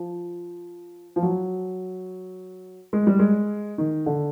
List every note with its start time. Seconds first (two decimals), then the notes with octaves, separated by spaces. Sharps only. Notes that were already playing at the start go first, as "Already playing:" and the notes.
Already playing: F3
1.16 F3
1.22 F#3
2.93 G#3
3.07 G3
3.19 G#3
3.78 D#3
4.06 D3